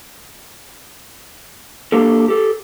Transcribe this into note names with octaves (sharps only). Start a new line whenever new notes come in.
A#3 D4 G4 A4
G4 A4